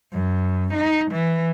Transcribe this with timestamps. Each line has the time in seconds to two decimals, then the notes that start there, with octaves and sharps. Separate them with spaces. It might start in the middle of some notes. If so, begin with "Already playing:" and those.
0.12 F#2
0.74 D#4
1.11 E3